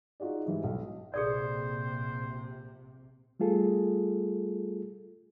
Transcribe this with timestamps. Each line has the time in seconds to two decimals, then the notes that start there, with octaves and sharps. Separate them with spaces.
0.20 D#4 F4 F#4 G#4 D5
0.46 G#2 E3 G3
0.64 B1
1.14 A#1 C3 G#4 A4 C5 D5
3.40 G3 A3 F4 G#4 A4